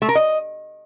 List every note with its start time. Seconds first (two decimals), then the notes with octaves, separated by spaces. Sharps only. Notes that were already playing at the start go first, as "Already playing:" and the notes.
0.02 A3
0.09 A#4
0.15 D#5